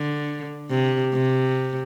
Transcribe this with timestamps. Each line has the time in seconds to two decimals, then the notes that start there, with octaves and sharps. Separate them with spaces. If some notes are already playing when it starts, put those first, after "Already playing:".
Already playing: D3
0.70 C3
1.14 C3